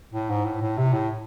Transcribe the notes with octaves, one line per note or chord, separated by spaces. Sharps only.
A2
G#2
A2
A2
C3
A2